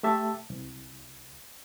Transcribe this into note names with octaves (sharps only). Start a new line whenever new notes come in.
A3 G4 E5 A5
C2